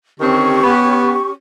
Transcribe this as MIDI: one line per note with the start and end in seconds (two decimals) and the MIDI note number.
0.20 0.62 50
0.20 0.62 51
0.20 0.62 60
0.20 1.31 61
0.20 1.31 67
0.20 1.31 85
0.63 1.13 59